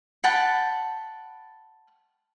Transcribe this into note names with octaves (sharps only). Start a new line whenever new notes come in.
F#5 G5 A5 B5